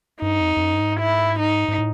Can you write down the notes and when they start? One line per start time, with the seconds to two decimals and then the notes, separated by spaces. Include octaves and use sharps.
0.22 G2 D#4
0.41 F2
0.57 F2
0.61 F#2
0.74 G2
0.80 G#2
1.00 E4
1.39 D#4
1.68 G#2
1.78 A2